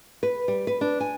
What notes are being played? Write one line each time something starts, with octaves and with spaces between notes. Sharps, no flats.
B4
G3
B4
D4
G#5